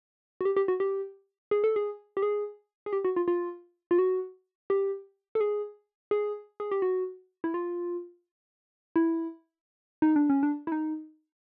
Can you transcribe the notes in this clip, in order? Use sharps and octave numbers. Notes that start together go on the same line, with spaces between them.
F#4
G4
G4
F#4
G4
G#4
A4
G#4
G4
G#4
G#4
G4
F#4
F4
F4
F4
F#4
G4
A4
G#4
G#4
G#4
G4
F#4
E4
F4
E4
D#4
D4
C#4
D4
E4
D#4